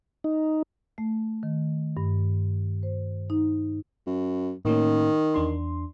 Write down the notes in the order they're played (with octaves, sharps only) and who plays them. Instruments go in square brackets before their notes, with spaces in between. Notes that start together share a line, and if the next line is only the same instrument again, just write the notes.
[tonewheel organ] D#4
[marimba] A3
D#3
G2
C5
D#4
[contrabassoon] F#2
[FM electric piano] A2 A#3 C#4 [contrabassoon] D#3
[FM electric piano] E2 D4 C6